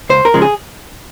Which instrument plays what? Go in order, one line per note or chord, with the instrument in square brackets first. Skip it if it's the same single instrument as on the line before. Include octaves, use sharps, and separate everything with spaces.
[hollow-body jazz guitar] C#2 C5
A#4
C#3 F3 G#3
G#4